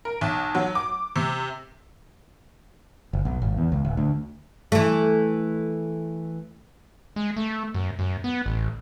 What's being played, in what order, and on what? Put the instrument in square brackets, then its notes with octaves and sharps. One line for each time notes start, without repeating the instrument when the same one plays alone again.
[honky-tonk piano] A#4
B1
F#3
D6
C3
[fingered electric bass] F#1
B1
G#1
E2
C#2
D1
D2
[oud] E3 A3
[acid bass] G#3
A3
F#2
F#2
B3
A1